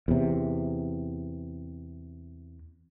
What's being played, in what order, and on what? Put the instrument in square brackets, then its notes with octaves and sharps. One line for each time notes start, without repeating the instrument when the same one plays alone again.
[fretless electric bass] E2 C3